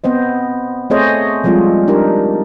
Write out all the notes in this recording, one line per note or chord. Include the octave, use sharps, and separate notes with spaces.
B3 C4 C5 D#5
A3 C4 G#4 C5 C#5 D#5
F3 G3 G#3 C4 F4
D4 D#4 G4 A#4